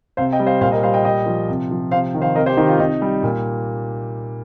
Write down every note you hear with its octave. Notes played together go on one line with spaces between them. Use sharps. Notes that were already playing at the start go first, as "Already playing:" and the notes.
C3 C5 F5
D#5 G5
G3
C5 F5
A#2 C5 F5
A#4 D#5
G3 C5 F5
D#5 G5
A#2 D#5 G5
F3
C3
F3
C3 C5 F5
D#3
C5 F5
C3 A#4 D#5
G4 C5
D#3 D#4 G4
F4
C3 D#4
G3
A#2